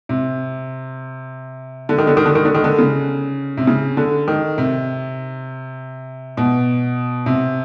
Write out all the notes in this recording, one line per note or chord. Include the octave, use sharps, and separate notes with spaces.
C3
D3
D#3
D3
D#3
D3
D#3
D3
D#3
D3
C#3
C3
C#3
D3
D#3
C3
B2
C3